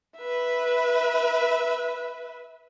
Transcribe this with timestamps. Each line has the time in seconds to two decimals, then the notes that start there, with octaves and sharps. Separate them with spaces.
0.18 B4 E5